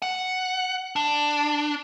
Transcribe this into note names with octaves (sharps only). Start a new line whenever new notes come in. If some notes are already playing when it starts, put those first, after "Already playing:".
F#5
D4